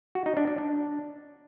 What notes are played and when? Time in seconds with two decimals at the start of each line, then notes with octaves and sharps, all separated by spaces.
0.15 F#4
0.26 D#4
0.37 D4
0.47 D4
0.58 D4